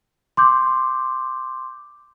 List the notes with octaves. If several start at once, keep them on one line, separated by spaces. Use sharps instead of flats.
C6 D6 G6